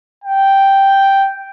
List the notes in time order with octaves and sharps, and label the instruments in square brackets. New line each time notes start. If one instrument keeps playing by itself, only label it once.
[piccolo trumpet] G5